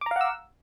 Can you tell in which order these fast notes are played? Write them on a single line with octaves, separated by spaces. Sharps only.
D6 A#5 F5 F#5 E6